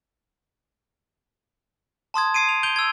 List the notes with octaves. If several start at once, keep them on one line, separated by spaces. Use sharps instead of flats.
A5 C6 D#6 G#6
D#6 G#6 C7 D7 D#7
F7
G6 D7 F7 G7
E6 G#6